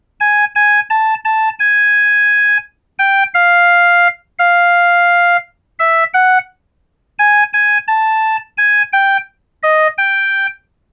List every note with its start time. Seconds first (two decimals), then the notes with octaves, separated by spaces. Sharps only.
0.20 G#5
0.55 G#5
0.90 A5
1.25 A5
1.60 G#5
2.99 G5
3.34 F5
4.39 F5
5.79 E5
6.14 F#5
7.19 G#5
7.53 G#5
7.88 A5
8.58 G#5
8.93 G5
9.63 D#5
9.98 G5